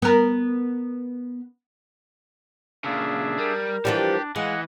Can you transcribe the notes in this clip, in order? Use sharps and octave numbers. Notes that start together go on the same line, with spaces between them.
B3 A#4
A#2 C#3 D4 G#4 E5 F5
G3 A#4
E3 F3 G3 D4 G4
E3 G#3 D#5 F5 F#5